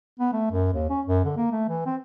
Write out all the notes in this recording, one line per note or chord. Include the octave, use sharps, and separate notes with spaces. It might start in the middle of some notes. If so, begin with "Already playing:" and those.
B3
A3
F#2
D#2
C#4
F#2
D3
A#3
A3
E3
C4